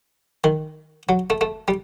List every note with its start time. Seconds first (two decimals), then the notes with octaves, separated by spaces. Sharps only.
0.44 D#3
1.09 F#3
1.30 A3
1.41 A3
1.68 G3